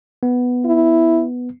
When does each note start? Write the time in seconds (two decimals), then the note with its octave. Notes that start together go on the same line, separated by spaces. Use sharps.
0.23 B3
0.65 E4